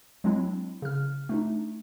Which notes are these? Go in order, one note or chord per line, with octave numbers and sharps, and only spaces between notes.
F#3 G#3 C4 D4 E4
C#3 F6
A3 D4 D#4